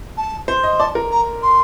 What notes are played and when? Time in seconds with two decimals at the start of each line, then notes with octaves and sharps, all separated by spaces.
0.17 A5
0.48 C5
0.63 D#5
0.79 D5 A5
0.95 A#4
1.11 A#5
1.42 C6